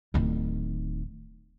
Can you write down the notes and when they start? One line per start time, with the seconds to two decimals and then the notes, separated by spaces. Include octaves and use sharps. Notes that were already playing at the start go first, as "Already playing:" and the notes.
0.14 D1 D#3